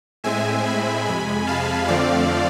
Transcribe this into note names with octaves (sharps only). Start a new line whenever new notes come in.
A2 G#3 C4 E5 G#5
G#5 B5
F2 C3 G#3 G#5 B5
F5 A5
F2 D3 F3 A3 C4 D5 F5